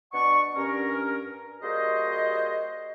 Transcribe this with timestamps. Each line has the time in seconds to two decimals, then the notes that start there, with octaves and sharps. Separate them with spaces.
0.13 B2 D4 D5 F#5 C#6
0.56 G2 C#4 A#4
1.62 G3 A#3 F#4 G#4 C5 D#5